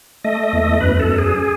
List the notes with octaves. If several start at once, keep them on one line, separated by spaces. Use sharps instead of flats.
A3 D#5
D#5
E2
D#5
F#2 B4
A4
F#2
G#4